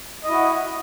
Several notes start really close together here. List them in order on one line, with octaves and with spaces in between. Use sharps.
D#5 E4 F#4